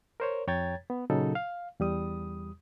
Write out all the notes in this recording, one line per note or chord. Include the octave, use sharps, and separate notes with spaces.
A#4 C5 C#5
F2 C#5 G5 A#5 G#6 A6
B3
A#2 C#3 F#3 D#4 A4
F5
E2 G3 D#6